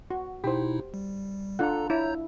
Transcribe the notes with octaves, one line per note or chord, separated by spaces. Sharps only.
F#4
B2 D#4 E4 G4 C5
G3
D4 F4 A4 F#5 A#5
E4 C#5 A#5 G6